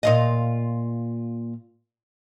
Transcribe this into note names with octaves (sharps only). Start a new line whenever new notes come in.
A#2 F4 D#5